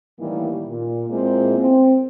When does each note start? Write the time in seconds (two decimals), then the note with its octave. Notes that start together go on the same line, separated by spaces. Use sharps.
0.19 A2 D#3 E3 G3 A#3
0.68 A#2
1.09 A#2 G#3 A#3 C4 E4
1.58 C4